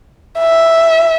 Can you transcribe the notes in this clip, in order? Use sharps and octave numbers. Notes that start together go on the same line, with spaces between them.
E5